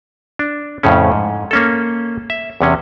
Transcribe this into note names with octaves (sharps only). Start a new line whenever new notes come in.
D4
F2 A2 C#3 C#4
G#2
A#3 C#4 A4
E5
E2 C3 C#4